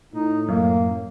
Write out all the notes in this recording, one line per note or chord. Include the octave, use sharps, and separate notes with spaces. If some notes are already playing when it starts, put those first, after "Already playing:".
A2 D#4
F#2 A#3